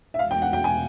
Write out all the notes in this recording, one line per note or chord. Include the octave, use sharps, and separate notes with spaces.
E5
E2 B2 G#3 B3 F5
G5
F#5
G5
G#5